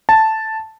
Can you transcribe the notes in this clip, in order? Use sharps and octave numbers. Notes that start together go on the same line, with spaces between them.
A5